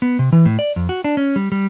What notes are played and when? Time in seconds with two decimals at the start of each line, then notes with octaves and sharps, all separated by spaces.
0.02 B3
0.19 C3
0.32 E3
0.45 A2
0.59 D5
0.76 F2
0.89 F#4
1.04 D4
1.17 C#4
1.36 G3
1.52 G3